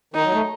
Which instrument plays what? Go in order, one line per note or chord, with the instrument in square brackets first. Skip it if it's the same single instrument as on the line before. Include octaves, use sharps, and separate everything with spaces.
[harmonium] D#3 [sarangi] D#4
[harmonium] F#3
A3